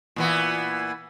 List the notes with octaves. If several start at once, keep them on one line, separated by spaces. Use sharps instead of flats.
A#2 E3 B3